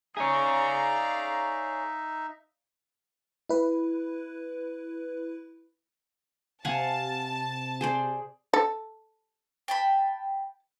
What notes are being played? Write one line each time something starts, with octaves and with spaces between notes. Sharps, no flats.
D#4 G#4 C#5 D5 E5 F5 A#5
E4 B4
C3 F5 F#5 G#5 A5
G#4 C5 D5
A4
G5 A5 B5